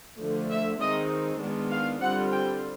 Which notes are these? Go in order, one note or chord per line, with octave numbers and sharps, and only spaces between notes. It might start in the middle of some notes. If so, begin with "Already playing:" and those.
D3 F3 A3
E5
D#3 G#3 C4 D#4 D#5
D#3 G#3 B3 D4 F4
F5
D3 G3 C4 F4 F#5
G5